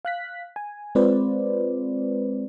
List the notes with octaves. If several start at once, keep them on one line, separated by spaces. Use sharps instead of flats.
F5 F#6 B6
G#5
G#3 C4 F4 B4 C5 D5